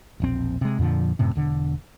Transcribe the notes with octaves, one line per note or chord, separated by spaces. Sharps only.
E1 A#1 C4
C3 G#3
F2 A#2 D3 F3
F#2 A2 C3
E1 D3